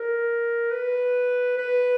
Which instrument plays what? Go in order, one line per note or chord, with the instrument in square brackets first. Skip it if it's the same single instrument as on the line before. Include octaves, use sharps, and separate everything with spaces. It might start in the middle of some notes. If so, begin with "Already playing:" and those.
Already playing: [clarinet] A#4
B4
B4